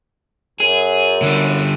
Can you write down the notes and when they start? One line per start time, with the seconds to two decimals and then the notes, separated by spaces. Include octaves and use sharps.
0.60 F#2 G#4
1.22 D3 G3